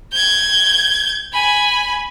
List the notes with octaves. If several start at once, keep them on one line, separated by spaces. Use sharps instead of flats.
G6 G#6
G#5 B5